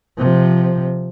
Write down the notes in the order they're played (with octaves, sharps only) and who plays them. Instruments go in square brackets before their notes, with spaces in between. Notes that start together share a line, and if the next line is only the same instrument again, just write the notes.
[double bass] C3 F3